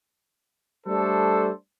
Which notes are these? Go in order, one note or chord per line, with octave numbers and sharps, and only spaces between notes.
G3 A3 D4 A4 C5